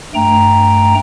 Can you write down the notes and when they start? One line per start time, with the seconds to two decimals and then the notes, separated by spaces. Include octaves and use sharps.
0.14 G2 A3 G5 A#5